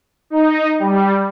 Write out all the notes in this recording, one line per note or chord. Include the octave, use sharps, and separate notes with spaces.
D#4
G3